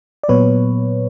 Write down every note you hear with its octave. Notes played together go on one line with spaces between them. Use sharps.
D5
A#2 F#3 B3 B4 C#5